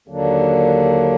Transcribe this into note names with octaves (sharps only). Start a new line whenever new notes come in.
D#2 D3 F#3 A#3 D4